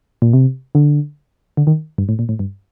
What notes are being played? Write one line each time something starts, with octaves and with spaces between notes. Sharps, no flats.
A#2
C3
D3
D3
D#3
G2
A2
A#2
A2
G2